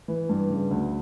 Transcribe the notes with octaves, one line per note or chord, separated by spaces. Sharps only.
E3
G2
C#3
D2